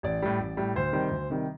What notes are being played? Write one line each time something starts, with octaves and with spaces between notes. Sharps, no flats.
A1 D5
A2 G3
A1
A2 G3
D2 C5
C3 D#3 G3
D2
C3 D#3 G3